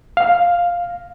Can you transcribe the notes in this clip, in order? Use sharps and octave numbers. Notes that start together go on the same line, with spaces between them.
F5